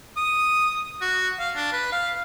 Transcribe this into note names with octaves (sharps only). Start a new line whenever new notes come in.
D#6
F#4
F5
D4
B4
F5